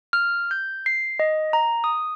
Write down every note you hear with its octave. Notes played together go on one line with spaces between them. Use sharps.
F6
G6
C7
D#5
A#5
D#6